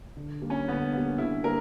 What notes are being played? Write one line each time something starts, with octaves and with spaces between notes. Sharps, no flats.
D3
G3 A#3
C#4
D3 B3
G3 A#3 B3
D3 E4
G3 A#3 A#4